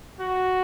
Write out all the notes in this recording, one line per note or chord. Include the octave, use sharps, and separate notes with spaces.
F#4